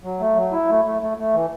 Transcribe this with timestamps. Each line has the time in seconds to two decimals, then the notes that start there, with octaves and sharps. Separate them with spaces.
0.04 F#3
0.20 A3
0.36 F#3
0.52 E4
0.69 A3
0.85 A3
1.02 A3
1.18 A3
1.34 E3